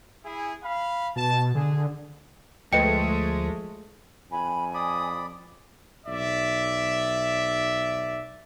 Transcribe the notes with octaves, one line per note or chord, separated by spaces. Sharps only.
E4 G#4
F5 B5
B2 A5
D3 G#4
D2 F3 G#3 A3 B4 D#5 G5 C#7
F2 G#5 B5
D5 B5 D#6
B1 D5 E5